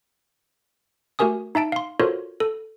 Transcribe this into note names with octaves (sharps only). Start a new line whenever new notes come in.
A3 F#4 G4 A#4 G#5 D#6
D#4 E5 A5 D7
F5 C6
F4 F#4 A4 A#4 C5 C#5
A4